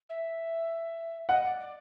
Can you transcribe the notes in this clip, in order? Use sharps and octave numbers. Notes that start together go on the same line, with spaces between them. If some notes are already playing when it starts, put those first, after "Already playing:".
E5
D#5 F#5
D5
D5